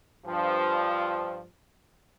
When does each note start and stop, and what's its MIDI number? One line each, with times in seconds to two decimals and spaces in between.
0.25 1.42 43
0.25 1.42 53